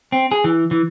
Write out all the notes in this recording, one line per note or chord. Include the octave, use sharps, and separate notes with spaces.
C4
G#4
E3
E3